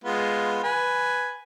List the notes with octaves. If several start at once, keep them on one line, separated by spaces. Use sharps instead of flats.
G#3 B3 F4
B4 G#5